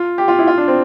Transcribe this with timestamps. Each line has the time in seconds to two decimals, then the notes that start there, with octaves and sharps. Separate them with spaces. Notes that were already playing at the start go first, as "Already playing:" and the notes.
Already playing: F4
0.18 G4
0.28 F4
0.39 E4
0.47 F4
0.58 D4
0.68 C4